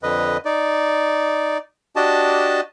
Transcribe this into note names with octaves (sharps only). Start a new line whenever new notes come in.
F2 D3 B4 D#5
D#4 D5
D4 F#4 G4 D#5 A5